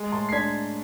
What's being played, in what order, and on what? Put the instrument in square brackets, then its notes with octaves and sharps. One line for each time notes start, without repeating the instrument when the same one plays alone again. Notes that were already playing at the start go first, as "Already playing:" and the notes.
Already playing: [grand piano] G#3
A2 A5 C6
C7
D4 G#6 B6